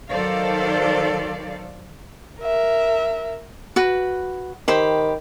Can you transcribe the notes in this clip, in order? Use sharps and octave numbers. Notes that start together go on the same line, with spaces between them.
D#3 F#3 A4 C5 D5 F5
A#4 E5
F#4 B4
D#3 G4 C5 B5